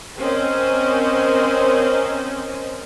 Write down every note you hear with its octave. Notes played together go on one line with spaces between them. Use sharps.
C4 C#4 A#4 C5 D#5